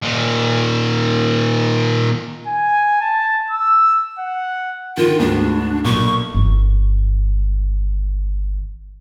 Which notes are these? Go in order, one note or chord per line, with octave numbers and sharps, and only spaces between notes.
A#2 D#3
G#5
A5
E6
F#5
D3 D#3 F4
D2 G#2 D4
B1 A#2 C#6
G1 D#3